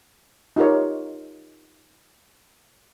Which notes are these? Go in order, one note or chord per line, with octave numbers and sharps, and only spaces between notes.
D#4 F4 G4 A#4 C#5